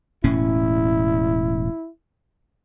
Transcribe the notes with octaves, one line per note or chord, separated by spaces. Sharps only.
E1 A2 C#4 E4